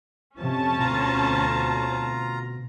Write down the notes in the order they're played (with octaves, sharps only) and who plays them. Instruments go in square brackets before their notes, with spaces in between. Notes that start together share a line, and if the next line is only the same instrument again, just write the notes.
[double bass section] F2 C3 F3 [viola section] C#4 A5
[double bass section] D2 C4 [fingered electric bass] B2 [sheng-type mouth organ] F4 A#5